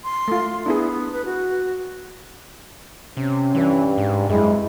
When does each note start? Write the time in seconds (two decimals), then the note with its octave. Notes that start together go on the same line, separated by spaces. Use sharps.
0.04 C6
0.28 A3 F4
0.66 B3 D4 E4 G#4
1.12 B4
1.25 F#4
3.17 C3 C#4
3.55 G2 E3
3.98 G#2
4.30 F#2 G#3 C4 E4